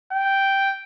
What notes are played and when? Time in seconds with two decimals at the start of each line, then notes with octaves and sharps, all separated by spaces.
0.12 G5